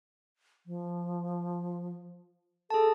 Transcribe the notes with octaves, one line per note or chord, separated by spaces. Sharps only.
F3
G#4 A4 A5